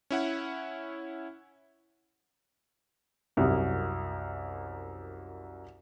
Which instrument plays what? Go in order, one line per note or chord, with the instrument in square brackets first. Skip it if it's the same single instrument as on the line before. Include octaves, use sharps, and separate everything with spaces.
[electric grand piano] C#4 E4 F#5
[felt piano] C2 F#2